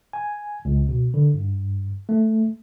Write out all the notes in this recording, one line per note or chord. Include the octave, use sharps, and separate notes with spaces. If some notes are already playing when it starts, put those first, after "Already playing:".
G#5
C#2
B2
D3
G2
A3